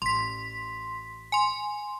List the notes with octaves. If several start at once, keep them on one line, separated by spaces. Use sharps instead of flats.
A1 C6 B6
G#5 C6